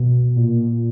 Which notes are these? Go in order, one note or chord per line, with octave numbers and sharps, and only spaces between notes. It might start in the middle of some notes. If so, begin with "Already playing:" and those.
Already playing: B2
A#2